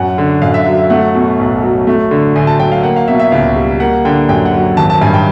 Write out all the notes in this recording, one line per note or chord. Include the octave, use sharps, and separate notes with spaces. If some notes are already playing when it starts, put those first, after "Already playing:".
Already playing: F#2 F#5
D3
F#2 F5
E5
F#3
E5
A3 F#5
B2
B1
F#3
A3
D3
D2 G#5
A5
F#3 G5
F5
A#3 F#5
F5
B2 E5
E5
C#2 F5
G3
A#3 F#5
D3 G5
F#2 G5
F#5
F#3
G#1 A5
A5
G2 G#5
G5